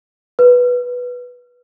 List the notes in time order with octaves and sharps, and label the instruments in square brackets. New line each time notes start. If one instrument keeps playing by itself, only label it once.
[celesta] B4